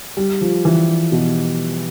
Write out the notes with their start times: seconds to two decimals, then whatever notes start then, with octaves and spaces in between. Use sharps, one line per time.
0.17 G3
0.41 F3
0.65 E3
1.12 B2